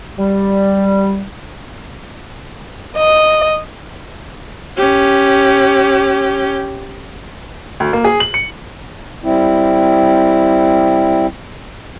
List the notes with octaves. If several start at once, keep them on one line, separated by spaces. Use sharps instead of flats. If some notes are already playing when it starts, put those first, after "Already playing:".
G3
D#5
C#4 G4
D2
A#3
G#4
F#7
C#7
G3 C4 E4